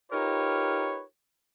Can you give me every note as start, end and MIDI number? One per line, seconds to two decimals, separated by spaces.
0.12 1.03 63
0.12 1.03 65
0.12 1.03 67
0.12 1.03 70
0.12 1.03 71
0.12 1.03 73